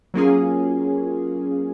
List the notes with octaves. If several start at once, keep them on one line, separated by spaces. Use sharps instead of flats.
F#3 A#3 C#4 F4 G#4